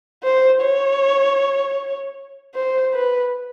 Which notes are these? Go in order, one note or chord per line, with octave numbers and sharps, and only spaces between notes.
C5
C#5
C5
B4